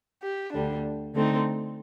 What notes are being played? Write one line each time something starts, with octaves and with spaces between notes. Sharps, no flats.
G4
D2 D3 G3 D4
D3 A3 C4 D#4